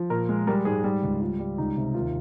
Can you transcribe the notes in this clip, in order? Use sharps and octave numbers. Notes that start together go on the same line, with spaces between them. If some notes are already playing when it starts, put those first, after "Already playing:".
Already playing: F3
A#2 A#4
G#3
G3 A#4
G#2 G#4
G3
C#2
G3 F4
G3
C#2 D#4
C3
D#2 F4